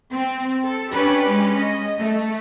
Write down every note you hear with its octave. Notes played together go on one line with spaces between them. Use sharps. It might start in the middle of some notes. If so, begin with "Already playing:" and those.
C4
A4
C#4 D4 G4 B4
G#3 C#4
D#5
A3